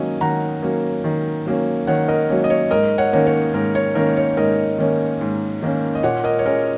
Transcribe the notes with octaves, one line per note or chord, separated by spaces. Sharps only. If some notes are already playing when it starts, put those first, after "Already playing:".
Already playing: D#3 F#3 A#3 C#4 D#5
D#3 F#5 A#5
F#3 A#3 C#4
D#3
F#3 A#3 C#4
D#3 C#5 F#5
A#4 D#5
F#3 A#3 C#4
D#5
C#5
G#2 A#4 D#5
C#5 F#5
D#3 A#3 C#4
C#5
G#2 A#4
C#5
D#3 A#3 C#4 A#4
C#5
G#2 A#4 D#5
D#3 A#3 C#4
G#2
D#3 A#3 C#4
D#5
A#2 C#5 F#5
A#4 D#5
C#5
G#3 C#4 A#4